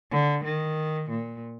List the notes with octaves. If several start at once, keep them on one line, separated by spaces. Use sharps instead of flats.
D3
D#3
A#2